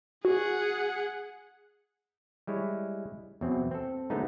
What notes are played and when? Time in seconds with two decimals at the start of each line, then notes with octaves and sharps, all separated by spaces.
0.25 F#4 G#4 F#5
2.47 G3 G#3 E4 C#5
3.41 E2 B2 F#3 C4
3.71 C4 A4
4.10 D3 F#3 G#3 A3 B3 D#4